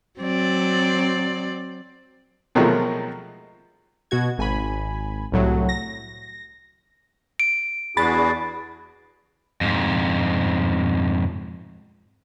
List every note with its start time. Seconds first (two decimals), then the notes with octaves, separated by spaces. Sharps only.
0.20 F#3 C4 D5
2.55 B2 D#3 F3 F#3 G#3 A3
4.11 B2 F#4 G#6
4.38 G#1 G#5 B5
5.32 C2 A2 F#3
5.69 A#6
7.40 D7
7.97 E2 D4 F#4 G#4 B5 A6
9.61 F2 G#2